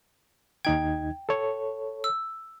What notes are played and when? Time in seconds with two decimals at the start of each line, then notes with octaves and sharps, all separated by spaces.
0.65 D#2 D#4 G5 G#6
1.29 A4 C#5
2.04 E6